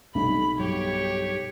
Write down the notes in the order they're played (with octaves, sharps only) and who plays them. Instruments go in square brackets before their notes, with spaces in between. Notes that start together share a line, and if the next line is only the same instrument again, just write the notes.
[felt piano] B1 [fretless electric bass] C3 G3 A3 [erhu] B5
[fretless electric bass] G2 B2 F#3 [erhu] G4 [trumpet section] C#5